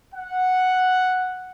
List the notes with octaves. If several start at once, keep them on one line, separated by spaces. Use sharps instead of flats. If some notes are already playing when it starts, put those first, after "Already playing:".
F#5